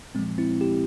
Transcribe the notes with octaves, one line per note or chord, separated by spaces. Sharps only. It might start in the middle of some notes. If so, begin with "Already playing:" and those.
A#2 F3 G#3 C4
C4 E4
E4 G4